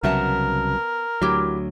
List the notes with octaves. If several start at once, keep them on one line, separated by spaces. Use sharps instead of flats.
C2 C#3 F#3 B3 A#4 E5 A5
D2 F#3 E4 G4